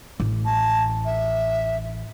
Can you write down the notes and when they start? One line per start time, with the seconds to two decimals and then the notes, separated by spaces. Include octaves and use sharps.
0.20 A1
0.45 A5
1.05 E5